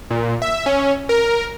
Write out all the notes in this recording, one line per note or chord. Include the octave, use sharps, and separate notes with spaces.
A#2
E5
C#4
A#4